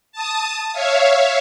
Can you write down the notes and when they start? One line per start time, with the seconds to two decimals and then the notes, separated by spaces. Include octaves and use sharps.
0.12 A5 D#6
0.73 C#5 E5 F5